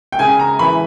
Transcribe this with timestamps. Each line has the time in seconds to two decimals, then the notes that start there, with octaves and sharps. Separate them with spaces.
0.12 G5
0.19 C#3 G#5
0.39 A#5
0.59 E3 B5